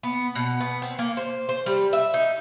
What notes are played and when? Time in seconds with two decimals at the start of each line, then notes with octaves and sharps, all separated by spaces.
0.03 B3
0.35 B2
0.61 B3
0.82 C4
0.99 A#3
1.17 C5
1.49 C5
1.66 G3
1.93 E5
2.14 D#4